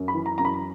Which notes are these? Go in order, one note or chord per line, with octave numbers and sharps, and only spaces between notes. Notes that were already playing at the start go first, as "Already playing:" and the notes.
Already playing: F#2
B5
E3
A#5
F#2 A#5
B5